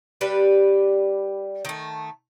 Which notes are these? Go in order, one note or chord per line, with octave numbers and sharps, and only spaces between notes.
G3 D4 G4 B4
D#3 A3